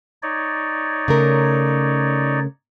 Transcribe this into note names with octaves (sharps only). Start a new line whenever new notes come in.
D#4 C#5 D5
C#3 A3 A#4